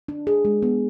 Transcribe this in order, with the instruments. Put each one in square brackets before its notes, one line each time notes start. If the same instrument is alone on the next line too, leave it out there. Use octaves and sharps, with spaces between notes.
[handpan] D4
G#4
G#3
B3